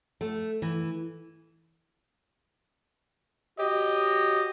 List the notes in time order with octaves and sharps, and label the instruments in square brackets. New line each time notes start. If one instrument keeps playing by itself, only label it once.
[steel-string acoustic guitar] A3
E3
[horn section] F#4 G4 C#5 D#5